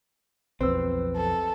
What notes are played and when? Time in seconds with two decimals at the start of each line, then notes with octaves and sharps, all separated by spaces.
0.61 B1 F2 C4 B4 C5 E6
1.16 A4